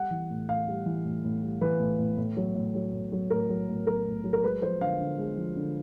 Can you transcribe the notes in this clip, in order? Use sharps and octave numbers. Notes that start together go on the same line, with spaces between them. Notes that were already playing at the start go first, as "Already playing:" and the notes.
Already playing: G3 F#5
E3
A2
A2 F5
G3
E3
A2
A2
G3
E3 B4
A2
A2
A2
F#3
A2
F#3
A2
F#3
A2 A#4
F#3
A2
F#3 A#4
A2
F#3
A#4
G#3 B4
F3 C5
D3 F5
D3
G#3
F3
D3